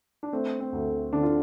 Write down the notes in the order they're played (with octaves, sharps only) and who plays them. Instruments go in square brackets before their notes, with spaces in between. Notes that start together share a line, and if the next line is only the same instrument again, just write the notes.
[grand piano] D4
[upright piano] A3 [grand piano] C4
[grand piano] C4
[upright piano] D2
[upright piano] D3 [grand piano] D4
[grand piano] F4